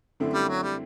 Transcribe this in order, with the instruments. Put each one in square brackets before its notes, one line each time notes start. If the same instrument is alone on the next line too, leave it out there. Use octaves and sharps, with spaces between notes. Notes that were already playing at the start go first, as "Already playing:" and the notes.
[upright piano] F#2 D3 A3 C4 E4
[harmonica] G3
F#3
G3